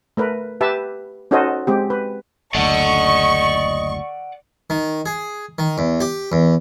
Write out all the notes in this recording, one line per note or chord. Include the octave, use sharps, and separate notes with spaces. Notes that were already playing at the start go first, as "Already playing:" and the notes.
A3 A#4 B4
G4 B4 E5 A5
C#4 D#4 F#4 A4 C5 D#5
G#3 C4 G4
B4
F#1 D2 D5 D#5 F#5 C#6
D#3
G#4
D#3
E2
G4
E2